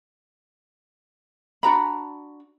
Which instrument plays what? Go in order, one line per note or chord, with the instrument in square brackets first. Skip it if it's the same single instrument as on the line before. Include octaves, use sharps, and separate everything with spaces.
[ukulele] D4 F#4 A#5 B5